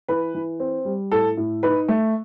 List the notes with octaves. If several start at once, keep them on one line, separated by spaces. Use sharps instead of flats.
E3 B4
E3
C4
G3
A2 A4
A2
D#4 B4
A3